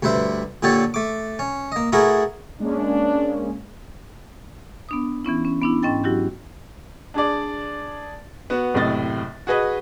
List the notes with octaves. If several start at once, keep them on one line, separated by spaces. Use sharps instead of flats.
D2 G2 B4 C5 E5
A#2 D3 G4 A4 C#5
A3 D6
C#4
A#3 D#5
A3 E4 F#4 G#4 A#4
G#3 A#3 C#4 D4
B3 D4 D#6
E3 B3 C#4 E4
C#4
B3 D4 E4
G#2 C#4 D#5 G5 A6
F#3 E4 F#4 G4
D4 G#4 D5
B3 F#4
F#1 A2 C3 D#5 A6
F#4 G#4 B4 D#5